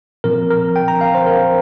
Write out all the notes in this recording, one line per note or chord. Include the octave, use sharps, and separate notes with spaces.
A#2 F3 C4 A#4
A#4
G5
A#5
F5
C5
A#4